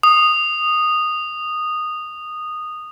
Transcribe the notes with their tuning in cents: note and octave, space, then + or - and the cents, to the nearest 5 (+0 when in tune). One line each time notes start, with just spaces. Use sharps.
D#6 -15